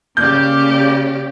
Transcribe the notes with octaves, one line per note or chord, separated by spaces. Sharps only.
C#3 A#3 G4 D5 G6